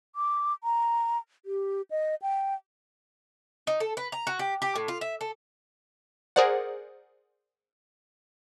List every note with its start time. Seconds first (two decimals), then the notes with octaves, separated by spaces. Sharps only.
0.16 D6
0.64 A#5
1.46 G4
1.91 D#5
2.22 G5
3.67 D#4
3.80 A4
3.97 B4
4.12 A#5
4.27 F#4
4.39 G4
4.62 G4
4.76 A2
4.88 F4
5.01 E5
5.21 A4
6.36 G#4 A#4 C5 D5 F#5